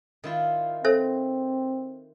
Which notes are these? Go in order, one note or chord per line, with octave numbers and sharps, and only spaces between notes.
D#3 E4 F4
C4 A4 C5 E5